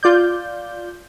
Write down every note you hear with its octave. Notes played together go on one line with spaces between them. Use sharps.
F4 D5 G6